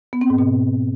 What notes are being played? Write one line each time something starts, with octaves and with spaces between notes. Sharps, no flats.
B3
C4
G#2
B2